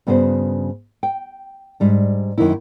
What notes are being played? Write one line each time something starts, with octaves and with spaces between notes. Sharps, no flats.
G2 C#3 B3 F#4 C5
G5
G#2 G3 D4
F#2 D#3 A#3 D#4 E4